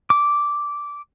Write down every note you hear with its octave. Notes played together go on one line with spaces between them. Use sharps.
D6